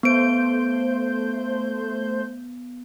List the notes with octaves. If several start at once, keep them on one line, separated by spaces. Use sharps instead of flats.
A3 B3 C5 G6 D7